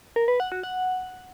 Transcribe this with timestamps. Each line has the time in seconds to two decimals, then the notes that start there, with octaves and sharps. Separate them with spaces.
0.16 A#4
0.28 B4
0.40 F#5
0.52 F#4
0.63 F#5